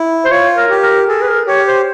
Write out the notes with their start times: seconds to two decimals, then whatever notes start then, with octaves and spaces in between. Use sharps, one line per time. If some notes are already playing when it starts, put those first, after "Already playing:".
Already playing: E4
0.25 C5
0.31 F4 C#5
0.57 A#4
0.70 G4
0.83 A#4
1.08 G#4 A4
1.22 B4
1.27 A#4
1.47 G4 C#5
1.66 C5